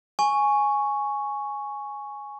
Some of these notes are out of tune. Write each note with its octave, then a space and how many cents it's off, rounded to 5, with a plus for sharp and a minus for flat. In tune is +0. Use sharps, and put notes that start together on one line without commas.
G#5 +0 C#6 +0